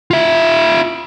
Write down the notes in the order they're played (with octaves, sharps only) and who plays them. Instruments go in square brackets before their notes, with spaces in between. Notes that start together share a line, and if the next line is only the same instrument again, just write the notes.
[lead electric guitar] F4 E5